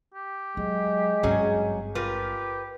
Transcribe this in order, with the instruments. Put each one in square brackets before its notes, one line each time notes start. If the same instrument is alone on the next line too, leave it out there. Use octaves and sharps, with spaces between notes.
[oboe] G4
[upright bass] F#3 [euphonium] G#3
[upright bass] G#1 G2 [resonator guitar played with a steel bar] F#3 C#4 G#4
[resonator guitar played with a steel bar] F4 A#4 B4 [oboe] G4